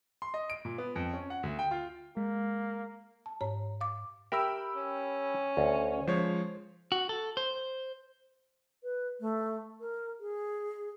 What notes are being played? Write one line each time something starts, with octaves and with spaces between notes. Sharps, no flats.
C6
D#5
D7
A#2
B3
F2
C#4
F#5
D2
G5
F4
G#3 A#3
A5
G#2 C#5 A#5
F5 D6
G4 A#4 E5 G5 B5 E6
C#4
D2
F3 G#3 C5 C#5
F#4
A4
C5
B4
A3
A#4
G#4